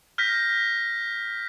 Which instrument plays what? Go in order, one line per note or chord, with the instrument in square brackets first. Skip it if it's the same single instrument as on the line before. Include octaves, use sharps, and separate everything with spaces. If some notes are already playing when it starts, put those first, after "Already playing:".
[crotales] F6 G6 A#6 B6